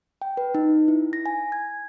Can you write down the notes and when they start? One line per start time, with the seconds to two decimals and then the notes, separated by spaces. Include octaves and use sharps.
0.22 G5
0.37 B4
0.55 D#4
0.88 E4
1.13 A#6
1.26 G#5
1.52 G#6